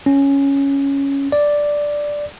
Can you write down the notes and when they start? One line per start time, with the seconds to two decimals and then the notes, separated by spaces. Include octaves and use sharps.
0.06 C#4
1.32 D5